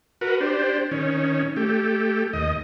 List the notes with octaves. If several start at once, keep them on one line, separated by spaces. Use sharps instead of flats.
F#4 A#4 B4
D4 G4 C5
D#3 C#4
A3 G4
D#2 D#5